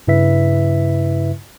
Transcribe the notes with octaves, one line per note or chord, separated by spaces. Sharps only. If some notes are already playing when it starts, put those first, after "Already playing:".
G2 C#3 E4 B4 E5 B6